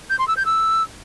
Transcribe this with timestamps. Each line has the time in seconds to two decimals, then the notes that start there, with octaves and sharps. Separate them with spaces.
0.10 G6
0.19 C6
0.28 E6
0.37 G6
0.46 E6